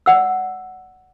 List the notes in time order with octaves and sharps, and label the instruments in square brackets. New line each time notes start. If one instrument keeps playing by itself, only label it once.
[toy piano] D5 F#5 E6